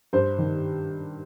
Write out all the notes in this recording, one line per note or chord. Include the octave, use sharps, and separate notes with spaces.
G2 C5
D#3